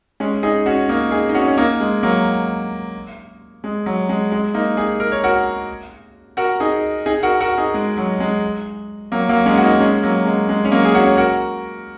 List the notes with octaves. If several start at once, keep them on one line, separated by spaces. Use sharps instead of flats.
G#3 C#4
D#4 G#4
C#4 F#4
A#3 D#4
D#4 G#4
D#4
C#4 F#4
C#4
A#3 D#4
G#3
F#3 A#3
G#3
F#3
G#3
G#3
A#3 D#4
D#4 G#4
A#4
C#5
F#4 A#4
F#4 A#4
D#4 G#4
D#4 G#4
F#4 A#4
F#4 A#4
D#4 G#4
G#3
F#3
G#3
F#3 A#3
F#3 A#3
G#3 C#4
F#4
A#3 D#4
G#3 C#4
F#3 A#3
G#3
G#3
C#4
F#3 A#3
G#4
C#4 F#4
C#5
F#4 A#4